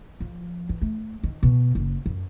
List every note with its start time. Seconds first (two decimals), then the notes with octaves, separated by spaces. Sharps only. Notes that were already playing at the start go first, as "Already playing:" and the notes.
0.20 F3
0.69 E3
0.81 A3
1.23 D#3
1.43 B2
1.75 F#1
2.06 F#2